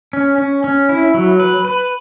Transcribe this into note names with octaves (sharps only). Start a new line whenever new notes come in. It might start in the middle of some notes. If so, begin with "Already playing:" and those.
C#4
C#4
C#4
E4
F#3
B4
B4